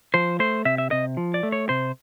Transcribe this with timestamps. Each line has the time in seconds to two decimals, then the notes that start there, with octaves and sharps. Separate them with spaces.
0.14 F3 C5
0.39 A3 C5
0.65 C3 E5
0.78 E5
0.91 C3 D#5
1.17 F3
1.34 D5
1.43 A3
1.52 C#5
1.69 C3 C5